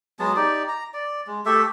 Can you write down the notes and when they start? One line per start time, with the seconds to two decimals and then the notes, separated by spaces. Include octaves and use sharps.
0.19 F#3 G#3 B3 A5
0.36 D#4 G4 D5
0.68 A#5
0.93 D5
1.27 G#3
1.46 A3 G4 A4 E5